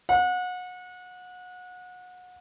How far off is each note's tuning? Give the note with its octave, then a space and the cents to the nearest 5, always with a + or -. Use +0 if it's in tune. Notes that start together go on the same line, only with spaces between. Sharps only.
F#5 -30